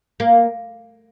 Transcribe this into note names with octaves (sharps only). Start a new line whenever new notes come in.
A#3